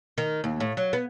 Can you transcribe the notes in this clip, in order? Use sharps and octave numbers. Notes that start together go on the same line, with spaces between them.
D#3
D#2
A2
F#3
B3